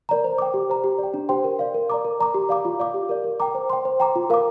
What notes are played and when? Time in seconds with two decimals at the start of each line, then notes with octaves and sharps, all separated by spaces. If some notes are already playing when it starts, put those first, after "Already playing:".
0.09 A#4 D5 A#5
0.24 C5
0.38 G5 D6
0.54 G4
0.69 C5 A#5
0.84 G4
0.98 D5 G5
1.14 D4
1.29 G4 C5 G5 C6
1.44 A#4
1.59 D5 F5
1.74 A#4
1.90 D5 A#5 D6
2.05 A#4
2.19 D5 A#5 D6
2.34 G4
2.49 D5 F5 A#5 D6
2.65 F4
2.80 D5 F5 D6
2.94 G4
3.09 A#4 D5
3.24 A#4
3.40 G5 A#5 D6
3.55 C5
3.70 G5 C6
3.85 C5
4.00 G5 A#5 D6
4.16 F4
4.30 A#4 F5 A#5 D6